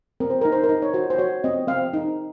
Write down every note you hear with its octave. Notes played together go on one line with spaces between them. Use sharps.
C4 A#4
C5
D#4 A#4
C5
A#4
D#4
C#5
F#4 C5
C5
F#4 C#5
C4 D#5
C4 F5
D#4